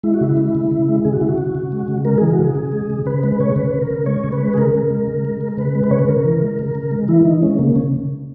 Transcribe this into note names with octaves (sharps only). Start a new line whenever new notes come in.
G#3 E4
F#4
C#3 E4
G#3
C#3
C#3
G#3
C#3 G#4
F#4
C#3 E4
F#4
C#3
C#3
G#3
C#3
G#3 A#4
E3 G#4
F#4
C#3 G#4
C#3
G#3
C#3
C#3 B4
G#3 B4
C#3 C#5
C#3 B4
C#3
A#4
C#3
G#3 C#5
C#3
B4
G#3
G#4
C#3 A#4
C#3
G#3
C#3
G#3
G#3
C#3 B4
G#3
B4
C#3 C#5
B4
C#3 A#4
E3
G#3
C#3
C#3
G#3
E3 E4
E3 D#4
G#3 C#4
C#3 A#3
C#3 C#4